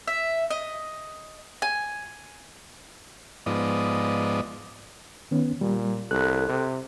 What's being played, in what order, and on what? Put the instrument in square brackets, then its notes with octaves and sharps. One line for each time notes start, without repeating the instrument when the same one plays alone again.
[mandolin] E5
D#5
G#5
[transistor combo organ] G#2 F3 B3 D5 D#5
[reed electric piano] D#3 B3 C#4
[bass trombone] A#2 [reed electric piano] G3
[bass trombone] C2 [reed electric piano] A4 F#6
[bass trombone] C3